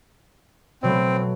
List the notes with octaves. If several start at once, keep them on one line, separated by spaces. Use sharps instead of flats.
B2 F#3 A3 C4